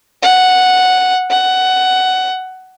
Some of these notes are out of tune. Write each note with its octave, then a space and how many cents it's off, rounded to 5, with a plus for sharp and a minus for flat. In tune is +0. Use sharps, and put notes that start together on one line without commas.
F#5 -5
F#5 +15